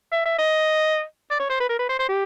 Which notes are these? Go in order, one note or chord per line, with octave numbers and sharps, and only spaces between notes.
E5
E5
D#5
D5
C#5
C5
B4
A#4
B4
C5
C5
G4